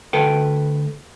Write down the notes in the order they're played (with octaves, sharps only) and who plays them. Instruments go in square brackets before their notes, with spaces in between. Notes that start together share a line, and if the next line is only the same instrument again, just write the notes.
[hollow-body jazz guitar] D2 A4 B4 G5